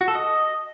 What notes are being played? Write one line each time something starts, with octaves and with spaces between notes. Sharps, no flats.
F#4
A4
D#5